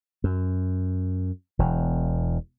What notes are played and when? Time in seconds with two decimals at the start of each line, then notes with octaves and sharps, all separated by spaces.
0.24 F#2
1.59 E1 E2